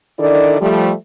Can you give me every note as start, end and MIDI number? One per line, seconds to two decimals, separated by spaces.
0.19 0.57 51
0.19 0.57 62
0.19 0.57 64
0.19 0.57 69
0.19 0.57 74
0.61 0.92 53
0.61 0.92 55
0.61 0.92 57